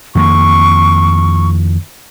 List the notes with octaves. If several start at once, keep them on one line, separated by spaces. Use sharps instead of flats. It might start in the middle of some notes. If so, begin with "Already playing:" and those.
F2 D#3 A#3 C#6